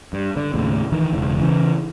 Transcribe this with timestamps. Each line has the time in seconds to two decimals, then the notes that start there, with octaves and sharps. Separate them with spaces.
0.13 G2
0.36 D3
0.53 D#2 A2 C#3
0.92 D#3 E3
1.13 E1 C#2
1.41 C#3 E3